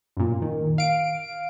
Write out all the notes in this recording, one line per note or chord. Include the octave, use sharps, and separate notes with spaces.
F#2 A#2
D#3
F5 D7